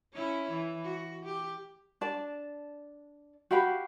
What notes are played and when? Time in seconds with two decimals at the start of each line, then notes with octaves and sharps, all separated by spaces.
0.13 C#4 E4 C#5
0.51 E3
0.84 F#4
1.25 G4
2.01 D4 D5 A5
3.51 F#4 G4 F5 B5